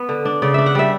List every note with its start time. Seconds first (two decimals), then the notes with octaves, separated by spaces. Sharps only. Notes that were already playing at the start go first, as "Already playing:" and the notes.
Already playing: B3
0.09 D3
0.25 D4
0.42 C#3 D5
0.54 D4 E5
0.66 F#5
0.75 G3 E5